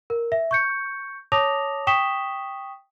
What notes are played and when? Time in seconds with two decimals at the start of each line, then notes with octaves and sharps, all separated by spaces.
0.10 A#4
0.32 E5
0.51 C#6 G6 C#7
1.32 C#5 A5 D6 D#6 A#6 F7
1.87 G5 C#6 D#6 B6 E7 G7